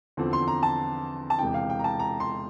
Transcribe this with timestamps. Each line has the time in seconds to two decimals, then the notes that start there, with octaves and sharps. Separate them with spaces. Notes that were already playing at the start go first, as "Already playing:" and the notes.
0.17 E2 D3 F3 C4
0.33 C6
0.48 A#5
0.63 A5
1.30 A5
1.39 E1 E2 C3 E3 G5
1.54 F5
1.70 G5
1.79 A#5
1.84 A5
2.00 A#5
2.20 C6